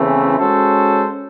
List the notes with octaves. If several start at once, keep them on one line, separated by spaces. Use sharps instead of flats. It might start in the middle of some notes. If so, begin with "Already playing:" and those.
Already playing: E2 C#3 E3 A3 C4
G#3 C#4 F#4 A4 C5